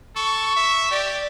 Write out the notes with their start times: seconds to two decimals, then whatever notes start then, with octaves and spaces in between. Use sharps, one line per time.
0.16 A4 C#6
0.56 E5
0.91 G4 D5